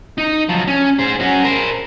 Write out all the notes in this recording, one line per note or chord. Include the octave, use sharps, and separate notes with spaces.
D#4
F3 F#3
C#4
G#4 C5
C#4 F#4
A#4 C5